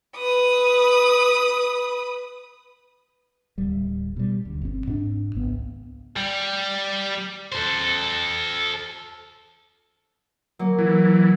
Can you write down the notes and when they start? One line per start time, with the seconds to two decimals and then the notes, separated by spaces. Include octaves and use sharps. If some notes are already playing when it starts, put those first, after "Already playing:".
0.17 B4 D#6
3.58 D1 G3
4.16 B2 G3
4.45 D2
4.62 G1 C4
4.87 G#2 D4
5.35 G#1 C#2 B3
6.17 G3
7.52 A4 C5
10.59 F#3 A#3
10.79 E3